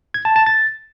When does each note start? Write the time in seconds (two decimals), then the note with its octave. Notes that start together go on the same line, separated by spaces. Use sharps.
0.14 G#6
0.25 A5
0.36 A5
0.46 A6